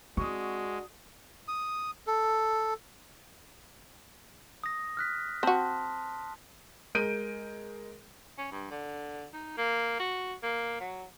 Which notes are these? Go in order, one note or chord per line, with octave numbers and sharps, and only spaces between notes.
G#3 C4 D4 F#4 C#6 D#6
D#6
A4
D#6 A#6
F6 F#6 B6
C4 F#4 A5 C6
G#3 A#4 G6 D7 D#7
C#4
G2
D3
D#4
A#3
F#4
A#3
F#3